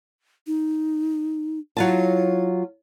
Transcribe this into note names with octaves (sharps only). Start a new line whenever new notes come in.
D#4
F#3 E4 F4 A5